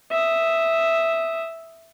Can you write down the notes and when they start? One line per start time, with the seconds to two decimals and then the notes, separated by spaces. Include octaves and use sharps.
0.11 E5 D#6